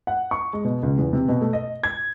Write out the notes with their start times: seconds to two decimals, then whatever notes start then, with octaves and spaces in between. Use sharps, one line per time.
0.07 F#5
0.31 C#6
0.53 G#3
0.65 B2
0.83 C#2
0.98 E2
1.13 C3
1.28 B2
1.41 A3
1.53 D#5
1.83 G#6